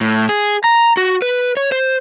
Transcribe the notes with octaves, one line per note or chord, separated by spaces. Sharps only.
A2
G#4
A#5
F#4
B4
C#5
C5